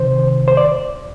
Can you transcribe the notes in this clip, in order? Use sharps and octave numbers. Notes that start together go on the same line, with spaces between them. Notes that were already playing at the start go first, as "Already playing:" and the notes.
Already playing: C3 D#3 C5
C5
D5